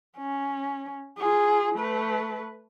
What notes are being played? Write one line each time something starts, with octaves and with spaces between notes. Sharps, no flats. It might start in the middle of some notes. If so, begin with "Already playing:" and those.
C#4
F4 G#4
A3 B4